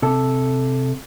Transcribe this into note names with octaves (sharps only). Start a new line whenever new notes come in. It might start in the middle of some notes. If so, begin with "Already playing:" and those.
C3 A4 A5